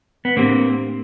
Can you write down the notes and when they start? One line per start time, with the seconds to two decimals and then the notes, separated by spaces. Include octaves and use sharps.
0.25 B3
0.37 A2 E3 A3 A#3 C4 D4 G4